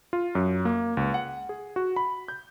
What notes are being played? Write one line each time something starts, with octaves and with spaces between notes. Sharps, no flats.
F4
F#2
A#3
C#2
F#5
G#4
F#4
B5
G6